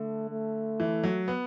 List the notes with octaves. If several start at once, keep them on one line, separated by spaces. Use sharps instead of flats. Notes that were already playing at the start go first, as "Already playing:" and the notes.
Already playing: D3 A3
A3
E3
F#3
B3